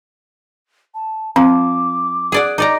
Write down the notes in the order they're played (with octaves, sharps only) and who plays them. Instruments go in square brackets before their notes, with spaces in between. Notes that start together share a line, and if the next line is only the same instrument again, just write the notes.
[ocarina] A5
[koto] F3 [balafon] C4 [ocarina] D6
[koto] G#4 D5 F#5
[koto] D#4 D5 A#5 [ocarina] D6